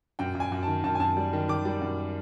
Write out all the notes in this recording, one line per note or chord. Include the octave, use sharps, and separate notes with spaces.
F#2 G5
F#2
G#5
F#2
D#3 A5
F#2 A5
G#5
F#2 A5
G3
D#3
D#3 D6
G3
F#2